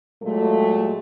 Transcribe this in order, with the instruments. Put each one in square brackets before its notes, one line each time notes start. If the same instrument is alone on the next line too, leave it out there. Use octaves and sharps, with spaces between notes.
[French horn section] A#2 F#3 G#3 A3